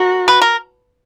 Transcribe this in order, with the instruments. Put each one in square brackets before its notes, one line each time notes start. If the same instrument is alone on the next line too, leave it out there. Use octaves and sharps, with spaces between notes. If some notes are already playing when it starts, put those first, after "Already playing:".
Already playing: [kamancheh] F#4 [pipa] A#4
[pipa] B4
A#4